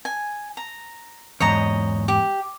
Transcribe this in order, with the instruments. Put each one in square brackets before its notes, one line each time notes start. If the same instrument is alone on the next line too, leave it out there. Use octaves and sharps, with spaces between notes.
[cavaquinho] G#5
A#5
[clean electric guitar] E2 G#2 [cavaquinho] C#5 D#5 A#5
[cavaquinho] G4